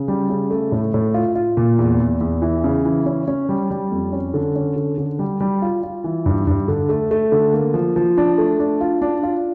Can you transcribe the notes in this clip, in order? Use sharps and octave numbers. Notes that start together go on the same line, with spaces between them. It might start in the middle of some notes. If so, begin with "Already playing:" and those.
Already playing: C#3
G3
C#3
A3
A2
A2
F4
F4
A#2
E2
E2
E2
E3
C#3
E3
C#4
C#4
G3
G3
F2
C#4
D3
C#4
D3
D3
G3
G3
F4
F4
E3
G2
G2
D3
A3
A3
D3
A#3
F3
F3
D4
A3
D4
F4
D4
F4